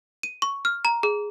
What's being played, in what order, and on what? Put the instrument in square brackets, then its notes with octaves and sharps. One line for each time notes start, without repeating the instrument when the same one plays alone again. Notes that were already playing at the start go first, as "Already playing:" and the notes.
[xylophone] D#7
C#6
F6
A#5
G#4